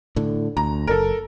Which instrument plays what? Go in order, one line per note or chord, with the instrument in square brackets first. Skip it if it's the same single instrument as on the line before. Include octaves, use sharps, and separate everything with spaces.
[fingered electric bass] A2 D3
[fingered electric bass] D2 [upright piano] A#5
[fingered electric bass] F#1 [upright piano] A4 A#4